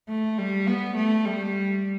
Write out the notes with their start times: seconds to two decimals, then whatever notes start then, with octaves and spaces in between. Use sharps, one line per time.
0.09 A3
0.38 G3
0.67 B3
0.96 A3
1.26 G3